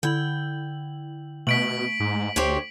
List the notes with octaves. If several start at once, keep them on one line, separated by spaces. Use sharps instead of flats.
D3 E4 G5 F#7
B2 A3 B6 D7 F#7
G#2
D2 G4 C5 C#5